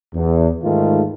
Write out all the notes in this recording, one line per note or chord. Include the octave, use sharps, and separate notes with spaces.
E2
G#2 D#3 G#3 A3 F4